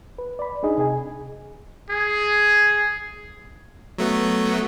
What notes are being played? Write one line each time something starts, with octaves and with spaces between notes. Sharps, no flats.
B4
D5 B5
D4 D#4 G#4 D#5
C3 G#4 G#5
G#4
F#3 A3 B3